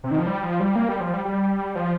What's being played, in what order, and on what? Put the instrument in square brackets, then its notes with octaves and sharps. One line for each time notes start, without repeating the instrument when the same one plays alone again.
[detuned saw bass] C3
D#3
F3
G3
F3
G3
A#3
G3
F3
G3
G3
F3